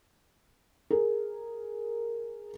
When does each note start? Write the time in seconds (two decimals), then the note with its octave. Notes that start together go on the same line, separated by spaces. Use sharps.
0.90 G#4 A#4